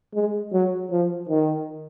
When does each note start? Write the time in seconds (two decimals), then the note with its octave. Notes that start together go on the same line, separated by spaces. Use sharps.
0.14 G#3
0.52 F#3
0.91 F3
1.29 D#3